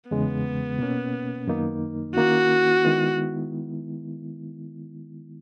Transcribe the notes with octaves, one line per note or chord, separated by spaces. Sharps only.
E2 C#3 G#3 B3
B2 A#3 C#4
F#2 D#3 A#3 D#4
D#3 A#3 C#4 E4 F#4
D#3 G#3 B3 E4